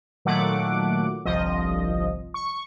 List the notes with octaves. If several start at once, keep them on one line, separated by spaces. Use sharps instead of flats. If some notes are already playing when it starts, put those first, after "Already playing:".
A#2 D#3 F#3 A3 F#5 D6
G1 C2 F3 D#5
C#6